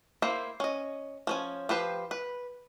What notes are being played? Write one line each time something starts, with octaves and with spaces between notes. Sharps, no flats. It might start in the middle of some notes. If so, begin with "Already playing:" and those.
A#3 E4 C5
C#4 D#5
F3 C#4 G#5
F3 G4 B4 C5
B4